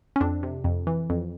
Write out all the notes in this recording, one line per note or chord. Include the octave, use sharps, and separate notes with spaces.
C#4
F2 C4 D4
C3
F2
E3
F2